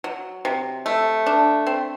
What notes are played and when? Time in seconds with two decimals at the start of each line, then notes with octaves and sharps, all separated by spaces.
0.04 F#3
0.45 C3
0.86 A3
1.26 D4
1.67 C4